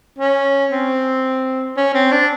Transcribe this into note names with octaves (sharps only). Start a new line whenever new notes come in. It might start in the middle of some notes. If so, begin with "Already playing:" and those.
C#4
C4
C#4
C4
D4